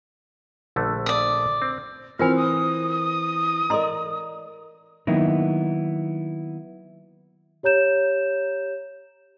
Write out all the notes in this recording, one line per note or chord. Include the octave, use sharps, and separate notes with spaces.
A#1 D3 A3
D5 D#6
C4
E3 C4 F4 A#4 G#5 F6
D#6
A#4 D5 D#5 A#5 C6
D#3 F#3 A#3 B3 D#4 E4
G4 C#5 A#5 G6 E7